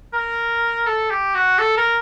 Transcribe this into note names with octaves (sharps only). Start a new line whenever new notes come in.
A#4
A4
G4
F#4
A4
A#4